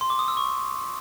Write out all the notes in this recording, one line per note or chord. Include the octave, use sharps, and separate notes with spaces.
C6
D6
D#6
E6
C#6